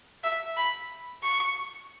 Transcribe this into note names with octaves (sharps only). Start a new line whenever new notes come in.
E5
B5
C#6